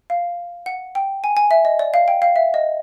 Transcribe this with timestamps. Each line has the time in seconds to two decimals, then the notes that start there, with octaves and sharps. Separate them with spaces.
0.10 F5
0.66 F#5
0.95 G5
1.24 G#5
1.37 G#5
1.51 E5
1.65 D#5
1.79 D5
1.94 F5
2.08 G5
2.22 F5
2.36 E5
2.54 D#5